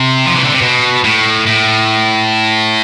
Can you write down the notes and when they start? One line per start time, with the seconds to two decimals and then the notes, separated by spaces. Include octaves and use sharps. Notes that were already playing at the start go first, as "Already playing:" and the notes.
Already playing: C3
0.26 F3
0.35 E3
0.44 D3
0.53 C3
0.61 B2
1.04 A2
1.47 A2